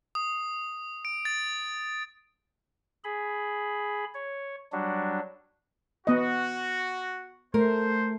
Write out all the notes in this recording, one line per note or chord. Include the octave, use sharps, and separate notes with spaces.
D#6
D7
A6
G#4 B5
C#5
F#3 G3 D4 F#4
B3 F#4 D#5
A3 A#4 C5